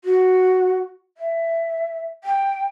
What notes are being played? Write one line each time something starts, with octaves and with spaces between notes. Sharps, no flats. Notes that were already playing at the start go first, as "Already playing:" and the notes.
F#4
E5
G5